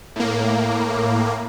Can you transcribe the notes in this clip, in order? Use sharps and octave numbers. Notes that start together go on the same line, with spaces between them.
A2 A#3